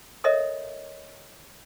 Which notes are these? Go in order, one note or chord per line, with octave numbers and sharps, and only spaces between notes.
A4 A#4 C#5 D#5 E5